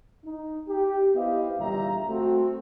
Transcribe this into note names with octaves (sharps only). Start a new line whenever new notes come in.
D#4
G4
B3 E4 G4 C5 D#5 F5
G1 E2 A#2 G3 E5 A#5
A3 C4 F#4